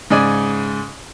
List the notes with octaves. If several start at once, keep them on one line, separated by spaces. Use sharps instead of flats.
G#2 C#3 D5 G#5